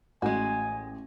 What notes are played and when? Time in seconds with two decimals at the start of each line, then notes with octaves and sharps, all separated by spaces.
0.22 A1 G#3 F#4 G#5